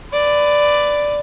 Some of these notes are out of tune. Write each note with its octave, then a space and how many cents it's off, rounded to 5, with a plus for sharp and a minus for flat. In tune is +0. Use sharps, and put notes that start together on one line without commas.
B4 +20 D5 +0